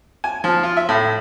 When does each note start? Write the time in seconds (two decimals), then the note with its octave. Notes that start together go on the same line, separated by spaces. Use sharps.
0.24 G#5
0.44 F3
0.63 F4
0.77 E5
0.89 A2